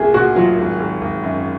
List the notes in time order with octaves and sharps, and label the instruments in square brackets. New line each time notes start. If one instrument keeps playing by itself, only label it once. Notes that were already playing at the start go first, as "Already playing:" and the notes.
Already playing: [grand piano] C2 A#2 [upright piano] G#4
[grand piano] A#2 [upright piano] F#4
[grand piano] F#3 [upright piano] F4
[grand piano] G#1
G#1
G#1
F#2